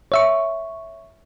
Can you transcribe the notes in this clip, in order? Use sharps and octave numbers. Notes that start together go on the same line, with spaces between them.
C#5 E5 C#6